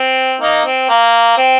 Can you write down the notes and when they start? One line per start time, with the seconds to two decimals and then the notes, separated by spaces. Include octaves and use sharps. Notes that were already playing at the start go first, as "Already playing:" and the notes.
Already playing: C4
0.41 A#3 D#4
0.66 C4
0.89 A#3
1.38 C4